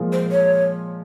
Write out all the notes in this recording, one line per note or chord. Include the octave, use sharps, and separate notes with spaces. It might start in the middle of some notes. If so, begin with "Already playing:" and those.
Already playing: A#2 F3 G#3
C5
C#5